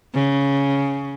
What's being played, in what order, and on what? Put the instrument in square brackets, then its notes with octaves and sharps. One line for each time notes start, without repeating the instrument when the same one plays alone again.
[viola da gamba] C#3